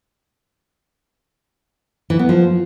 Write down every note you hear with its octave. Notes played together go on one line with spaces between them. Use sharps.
E3
B3
F3